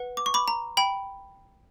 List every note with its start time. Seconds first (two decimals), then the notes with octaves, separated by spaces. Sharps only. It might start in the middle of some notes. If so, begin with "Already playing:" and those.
Already playing: B4 F#5
0.17 D6
0.26 C#6
0.34 B5 D6
0.48 A#5
0.77 G5 B5